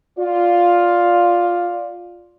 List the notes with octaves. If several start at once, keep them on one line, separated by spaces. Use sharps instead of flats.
F4 D5